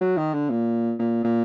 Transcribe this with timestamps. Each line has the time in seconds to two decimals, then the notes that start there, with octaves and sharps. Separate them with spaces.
0.01 F#3
0.17 D#3
0.33 D3
0.50 A#2
0.99 A#2
1.24 A#2